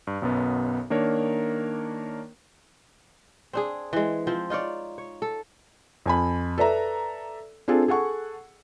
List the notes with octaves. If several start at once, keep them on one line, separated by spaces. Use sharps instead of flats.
G2
B1 F#2 B2 B3
D#3 A#3 D4 A#4 C#5
C4 D4 G#4
E3 G#3
F3 C4
D#4 F4 C#5 D5
C#5
A4
F2 G#5 B5
A4 B4 D5 E5 A#5
C4 D4 F4 G#4 A4
G#4 A4 F#5 C#6